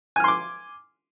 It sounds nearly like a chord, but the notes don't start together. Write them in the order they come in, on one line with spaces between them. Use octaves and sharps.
G#5 F6 C6 D6